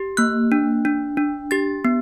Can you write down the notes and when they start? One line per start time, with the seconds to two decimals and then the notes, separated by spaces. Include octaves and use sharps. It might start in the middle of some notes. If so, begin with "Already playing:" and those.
Already playing: G4
0.17 A#3 F#6
0.52 D4
0.85 D4
1.17 D4
1.51 G4 A6
1.85 B3